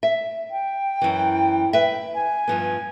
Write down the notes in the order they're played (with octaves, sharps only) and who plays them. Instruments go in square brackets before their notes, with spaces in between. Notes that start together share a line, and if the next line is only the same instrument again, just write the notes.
[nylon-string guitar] E5
[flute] G5
[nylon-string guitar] F#2 E3
B4 E5
[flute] G#5
[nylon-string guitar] G2 F3 B3